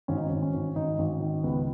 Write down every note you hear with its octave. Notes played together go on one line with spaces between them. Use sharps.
G#1 C#4
D#4
G#1 C#4
C#4
G#1
G#1 D#4
G#1
C#4
D#3
C#2 B3